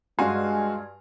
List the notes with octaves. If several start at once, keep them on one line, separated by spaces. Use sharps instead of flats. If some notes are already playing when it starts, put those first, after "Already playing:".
G2 G#3 F#4 F5 G#5 C6